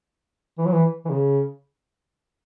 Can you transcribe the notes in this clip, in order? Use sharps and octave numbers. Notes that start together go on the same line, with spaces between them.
E3
F#3
E3
E3
C#3